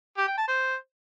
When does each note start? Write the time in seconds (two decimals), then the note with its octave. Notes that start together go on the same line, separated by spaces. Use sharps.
0.17 G4
0.27 G5
0.38 A5
0.48 C5